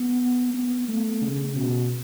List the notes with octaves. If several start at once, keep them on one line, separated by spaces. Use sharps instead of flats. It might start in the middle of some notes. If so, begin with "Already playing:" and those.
Already playing: B3
B3
A3
C#3
B2